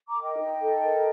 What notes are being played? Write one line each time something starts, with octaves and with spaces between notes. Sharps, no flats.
A#5 D6
A#4
D#5 G5
D#4
A4
A#4